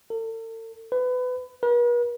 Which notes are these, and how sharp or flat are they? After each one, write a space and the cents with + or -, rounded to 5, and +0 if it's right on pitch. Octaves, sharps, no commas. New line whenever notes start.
A4 +45
B4 +25
B4 -45